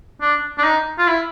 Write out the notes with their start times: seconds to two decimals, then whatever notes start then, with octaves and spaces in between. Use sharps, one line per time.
0.21 D4
0.58 D4
0.64 D#4
0.98 F4
1.07 E4